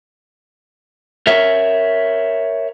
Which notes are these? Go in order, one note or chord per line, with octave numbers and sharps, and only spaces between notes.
A#4 C#5 E5